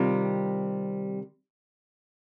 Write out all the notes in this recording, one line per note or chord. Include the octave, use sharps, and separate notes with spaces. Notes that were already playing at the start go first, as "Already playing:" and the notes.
Already playing: C3 D#3 G3 C4 F4